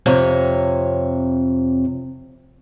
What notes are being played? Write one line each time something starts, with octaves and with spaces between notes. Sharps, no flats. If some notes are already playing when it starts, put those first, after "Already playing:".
F2 C3 C#5